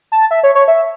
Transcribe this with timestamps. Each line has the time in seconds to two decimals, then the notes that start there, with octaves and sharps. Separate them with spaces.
0.12 A5
0.31 E5
0.43 C#5
0.55 C#5
0.68 E5